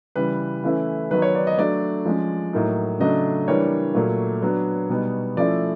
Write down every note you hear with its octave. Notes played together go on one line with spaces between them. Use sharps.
C#3 E3 G3 B4
E3 A3 C#4 E4
D#3 F#3 B3 D#4 B4
C#5
D5
D#5
F#3 A3 D4 D5
F3 G#3 C#4
A2 F#3 A#3 D#4
C#3 F#3 A3 D4 D#5
E3 G3 A#3 D4 C#5
A#2 F#3 A3
F#3 B3 D4
B2 G3 B3 D#4
F3 A3 C#4 E4 D5